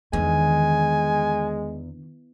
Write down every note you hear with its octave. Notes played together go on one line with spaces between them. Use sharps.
E2 D3 D#3 G#3 G#5